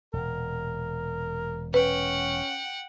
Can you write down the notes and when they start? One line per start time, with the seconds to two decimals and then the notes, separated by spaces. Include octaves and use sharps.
0.13 E1 A#2 A#4
1.74 C#4 B4 F#5 G5